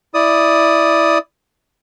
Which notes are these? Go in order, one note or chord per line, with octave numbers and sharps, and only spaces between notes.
E4 D5 D#6